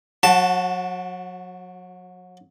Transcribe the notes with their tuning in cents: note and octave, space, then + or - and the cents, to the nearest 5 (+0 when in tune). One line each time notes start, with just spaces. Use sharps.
F#3 -35 F#4 +0 A5 +0